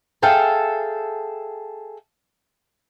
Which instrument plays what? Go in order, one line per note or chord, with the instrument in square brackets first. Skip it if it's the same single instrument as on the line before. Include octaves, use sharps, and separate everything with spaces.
[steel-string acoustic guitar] G#4 A4 E5 F5 G5 A5